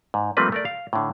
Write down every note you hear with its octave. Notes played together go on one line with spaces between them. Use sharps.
G#2
F3 G3 A3 A#3 C4 B4
A3 A#4 D5
F5
A2 D3